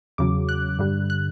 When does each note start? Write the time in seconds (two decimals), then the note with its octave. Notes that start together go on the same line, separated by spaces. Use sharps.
0.18 E2 C#3 F#3 D6
0.49 F#6
0.79 G2 D3 G3
1.10 F#6